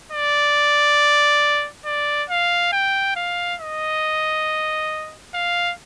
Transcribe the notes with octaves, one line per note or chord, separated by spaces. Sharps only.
D5
D5
F5
G5
F5
D#5
F5